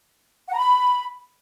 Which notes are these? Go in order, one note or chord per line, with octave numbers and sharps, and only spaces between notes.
F#5
A#5
B5